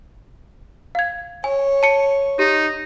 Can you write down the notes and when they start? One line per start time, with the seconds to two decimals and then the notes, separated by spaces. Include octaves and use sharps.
0.95 F5 G#6
1.44 C#5 G#5
1.83 A5 C#7
2.39 D#4 G4